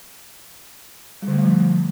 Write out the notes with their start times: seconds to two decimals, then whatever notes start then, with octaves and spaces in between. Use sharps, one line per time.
1.22 G3
1.28 D3
1.33 A3
1.39 G3
1.44 F3